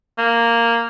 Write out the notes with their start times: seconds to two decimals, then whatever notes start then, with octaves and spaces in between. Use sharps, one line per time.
0.18 A#3